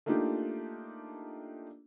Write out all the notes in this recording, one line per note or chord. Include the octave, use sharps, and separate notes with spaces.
A3 A#3 D4 D#4 F4 G4